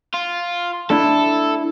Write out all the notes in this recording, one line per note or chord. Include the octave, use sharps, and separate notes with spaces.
F4
A3 D4 E4 A4